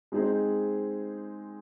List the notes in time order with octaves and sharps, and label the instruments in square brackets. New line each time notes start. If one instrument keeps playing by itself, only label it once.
[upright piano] G#3 C4 D#4 G#4 C5